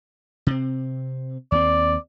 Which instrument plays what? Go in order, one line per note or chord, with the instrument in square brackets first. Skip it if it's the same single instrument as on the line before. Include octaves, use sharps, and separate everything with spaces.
[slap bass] C3 C4
[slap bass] D#2 C4 [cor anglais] D5